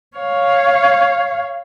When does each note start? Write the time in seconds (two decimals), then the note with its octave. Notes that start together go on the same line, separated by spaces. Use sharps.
0.17 C#5 F5